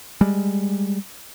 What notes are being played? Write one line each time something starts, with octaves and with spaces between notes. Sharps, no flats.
G3 G#3